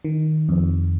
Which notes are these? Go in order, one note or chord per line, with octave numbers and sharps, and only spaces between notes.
D#3
F2